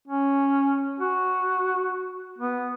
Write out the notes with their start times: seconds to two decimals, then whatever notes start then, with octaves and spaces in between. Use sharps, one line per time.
0.07 C#4
1.00 F#4
2.38 B3